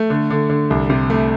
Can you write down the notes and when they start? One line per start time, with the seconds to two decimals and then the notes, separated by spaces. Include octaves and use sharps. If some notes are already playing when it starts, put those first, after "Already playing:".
Already playing: A3
0.10 D3
0.30 D3
0.50 D3
0.70 C2
0.90 C3
1.10 A3